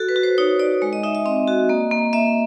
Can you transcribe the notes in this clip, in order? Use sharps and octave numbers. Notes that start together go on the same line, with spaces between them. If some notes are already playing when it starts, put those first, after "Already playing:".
Already playing: F#4 A4
B4
F#4
C5
D#4 C#5
D#4 D5
G#3 D5
D#5
D#4 E5
E5
C4 D#5
F#4
A#3
A#3
A#3 E5